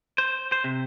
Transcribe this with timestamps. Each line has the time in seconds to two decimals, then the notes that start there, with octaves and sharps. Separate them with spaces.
0.18 C5
0.52 C5
0.64 C3